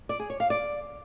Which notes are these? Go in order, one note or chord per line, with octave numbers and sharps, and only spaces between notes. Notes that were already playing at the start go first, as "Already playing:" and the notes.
D5
G#4
C#5
F5
D5